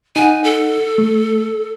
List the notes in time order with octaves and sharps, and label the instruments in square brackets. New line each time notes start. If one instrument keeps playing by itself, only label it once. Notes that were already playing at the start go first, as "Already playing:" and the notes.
[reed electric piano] D#4 F#5 [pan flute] G#5
[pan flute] A4
[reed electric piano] A3